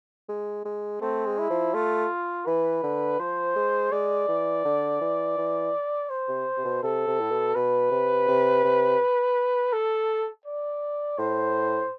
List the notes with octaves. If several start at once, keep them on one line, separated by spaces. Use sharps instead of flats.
G#3
G#3
A3 C4
G#3
E4
F3
A3 F4
E3 B4
D3
F3 C5
G#3
G#3 D5
E3
D3
E3
E3
C5
C3
C3
B2
C3 A4
C3
A2
B2
B2 B4
C3
C3
C3
A4
D5
A2 C5